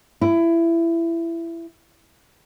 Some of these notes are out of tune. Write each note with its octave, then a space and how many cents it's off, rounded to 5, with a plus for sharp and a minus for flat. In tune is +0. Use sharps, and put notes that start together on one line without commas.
E4 +20